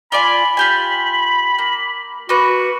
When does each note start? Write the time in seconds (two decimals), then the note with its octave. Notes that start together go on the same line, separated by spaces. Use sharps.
0.12 F4 D5 G#5 B5
0.57 F4 G4 G#5
1.58 A#3
2.29 A#3 F#4 B4